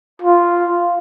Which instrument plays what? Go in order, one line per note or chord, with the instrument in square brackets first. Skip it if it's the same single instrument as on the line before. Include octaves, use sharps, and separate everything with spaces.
[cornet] F4